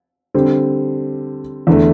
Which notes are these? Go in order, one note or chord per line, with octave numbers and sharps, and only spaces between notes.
D3 G3 C4
E2 D3 A3